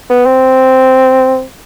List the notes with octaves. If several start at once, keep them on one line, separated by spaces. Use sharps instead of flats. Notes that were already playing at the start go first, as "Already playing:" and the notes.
B3
C4